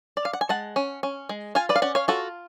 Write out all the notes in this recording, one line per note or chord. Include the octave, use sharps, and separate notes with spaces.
D5
F5
F#5
G#5
G#3 F#5 A5
C#4
C#4
G#3
F4 F5 G#5
B4 D5
F5
C#4 D5 F#5
C#5 F5
F4 F#4 A4